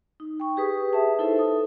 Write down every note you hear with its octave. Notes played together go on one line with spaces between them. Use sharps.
D#4
G5 C#6
G4 G#4 B4 D#6
B4 E5 A5
D#4 E4 A4 C5 E5
A4 D#6